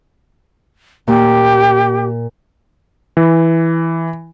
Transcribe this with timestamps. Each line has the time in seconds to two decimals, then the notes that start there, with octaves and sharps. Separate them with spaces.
1.08 A#2 G4
3.17 E3